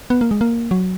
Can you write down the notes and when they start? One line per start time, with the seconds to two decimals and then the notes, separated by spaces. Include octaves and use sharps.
0.10 B3
0.21 A#3
0.31 G#3
0.41 A#3
0.71 F#3